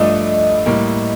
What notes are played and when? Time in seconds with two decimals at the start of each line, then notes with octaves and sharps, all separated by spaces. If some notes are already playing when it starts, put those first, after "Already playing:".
Already playing: G2 F3 A3 D4 A4 D#5
0.66 A2 G3 A#3